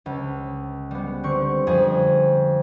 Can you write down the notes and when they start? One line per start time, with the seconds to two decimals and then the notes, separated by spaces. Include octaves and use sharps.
0.06 C#2
0.91 G3 B3
1.24 D3 C4 C#6
1.67 F2 G#4 G#5